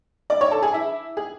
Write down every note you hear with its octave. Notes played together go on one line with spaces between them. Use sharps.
D5 D6
C#5 C#6
A4 A5
G#4 G#5
E4 E5
G#4